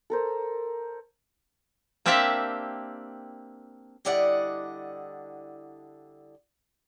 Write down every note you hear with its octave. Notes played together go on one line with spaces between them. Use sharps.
A4 A#4 C5
A#3 C4 D4 G4 E5 A5
D3 G3 E4 D5 D#5 F#5